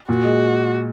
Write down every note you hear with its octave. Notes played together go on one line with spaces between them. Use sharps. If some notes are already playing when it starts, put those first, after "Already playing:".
A#2 F#4
G#3